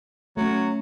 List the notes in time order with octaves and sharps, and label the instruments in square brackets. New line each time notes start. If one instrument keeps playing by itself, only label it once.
[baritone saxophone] F#3 [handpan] A3 C#4